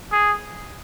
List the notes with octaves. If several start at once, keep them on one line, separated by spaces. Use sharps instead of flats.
G#4